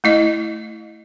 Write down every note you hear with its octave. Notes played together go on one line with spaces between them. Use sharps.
A3 E4 D#5